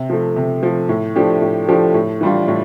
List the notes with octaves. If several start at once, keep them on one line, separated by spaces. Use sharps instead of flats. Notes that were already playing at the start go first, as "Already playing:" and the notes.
Already playing: C3
F3 A3
C3
F3 A3
A2
F3 A3 D4 G4
A2
F3 A3 D4 G4
A2
E3 G3 D4 F4
A2